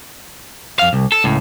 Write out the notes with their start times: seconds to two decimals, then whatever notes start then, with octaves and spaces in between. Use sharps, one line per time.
0.79 F2 F5
0.93 C2
1.12 A4
1.24 C#2 A2